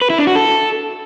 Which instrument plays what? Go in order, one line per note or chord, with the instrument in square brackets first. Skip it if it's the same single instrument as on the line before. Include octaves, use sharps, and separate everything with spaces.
[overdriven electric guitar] B4
E4
D4
F#4
A4